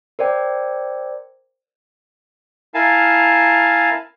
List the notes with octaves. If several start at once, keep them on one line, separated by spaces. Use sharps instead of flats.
A#4 C5 D5 G5
E4 A#4 F5 G#5 A5